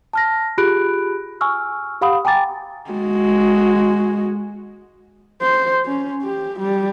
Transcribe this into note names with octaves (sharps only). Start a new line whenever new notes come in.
A5 F6 A#6
F4 G4 G#4 B5 F#6 D7
G#5 C#6 E6 F6
G4 F5 F#5 B5 D#6
G5 G#5 A#5 D6 A6
G#3 F#4
C5
C#4
G4
G3